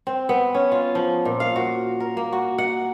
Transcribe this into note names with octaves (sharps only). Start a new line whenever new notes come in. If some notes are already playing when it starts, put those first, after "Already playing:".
C4
B3
C#4
F4
F3
A#2
F5
F#4
A#4
A#3
F#4
F#5